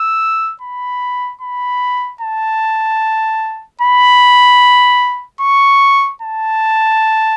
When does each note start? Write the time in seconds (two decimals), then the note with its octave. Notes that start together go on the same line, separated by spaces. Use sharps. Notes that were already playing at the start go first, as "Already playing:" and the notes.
Already playing: E6
0.61 B5
1.41 B5
2.21 A5
3.81 B5
5.41 C#6
6.22 A5